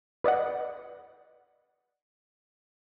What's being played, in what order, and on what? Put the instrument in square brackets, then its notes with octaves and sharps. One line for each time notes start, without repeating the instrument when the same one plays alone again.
[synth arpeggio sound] B4 D5 D#5 F#5